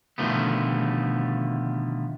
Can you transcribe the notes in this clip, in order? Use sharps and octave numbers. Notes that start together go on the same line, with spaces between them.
B2 D3 D#3 F3 A3 B3